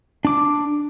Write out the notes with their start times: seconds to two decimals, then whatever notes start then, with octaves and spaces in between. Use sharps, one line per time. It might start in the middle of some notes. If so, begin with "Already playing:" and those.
0.25 D4 D6